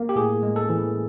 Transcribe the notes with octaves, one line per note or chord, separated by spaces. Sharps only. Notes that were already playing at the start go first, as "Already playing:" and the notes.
Already playing: A#3
G4
A2 G#4
G#3
A4
E3